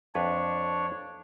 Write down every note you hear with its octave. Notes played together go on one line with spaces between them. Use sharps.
F2 D4 B4 C#5 D5